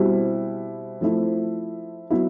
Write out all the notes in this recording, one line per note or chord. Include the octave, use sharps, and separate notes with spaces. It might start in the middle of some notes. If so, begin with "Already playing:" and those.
Already playing: B2 G3 C4 E4
F3 A3 C4 E4
F#3 B3 E4